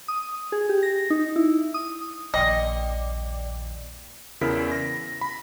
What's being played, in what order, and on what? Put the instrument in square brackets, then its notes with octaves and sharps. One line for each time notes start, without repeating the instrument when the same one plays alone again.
[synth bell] D#6
G#4
G4
A#6
D#4
E4
D#6
[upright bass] A#1 D#2 [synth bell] D5 G5 D6 [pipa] D#5
[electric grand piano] E2 C#3 E4 A#4 B6
A#6
B5